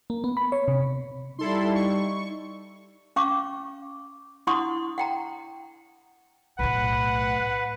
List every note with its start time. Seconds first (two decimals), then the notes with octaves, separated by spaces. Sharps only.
0.10 A#3
0.24 B3
0.37 B5
0.52 C#5
0.68 C3
1.39 G3 D#4 E4 A4 C6
1.75 C#6
3.16 C#4 F5 C#6 D6
4.47 D4 E4 F#5 C6 C#6 D#6
4.98 F#5 G5 A#5
6.59 B1 A2 B4 F#5